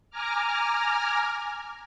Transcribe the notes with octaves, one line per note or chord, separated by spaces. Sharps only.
G#5 A#5 D6 F6